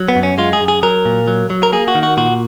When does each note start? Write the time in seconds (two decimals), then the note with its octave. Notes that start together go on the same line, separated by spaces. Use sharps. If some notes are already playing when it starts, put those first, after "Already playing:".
Already playing: F#3
0.08 B3
0.16 F#2
0.23 C#4
0.38 G#3 F4
0.53 G#4
0.60 F#2
0.68 G#4
0.83 F#3 A#4
1.05 A#2
1.28 F#3
1.50 F#3
1.63 A#4
1.72 A#3 G#4
1.88 F#4
1.95 D#3
2.03 F#4
2.17 A#2 F#4